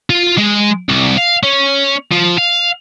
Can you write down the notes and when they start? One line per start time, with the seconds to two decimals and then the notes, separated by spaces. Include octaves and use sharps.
0.10 F4
0.37 G#3
0.89 C2
1.17 F5
1.43 C#4
2.12 F3
2.38 F5